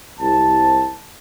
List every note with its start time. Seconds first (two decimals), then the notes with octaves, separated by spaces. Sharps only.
0.19 C2 A5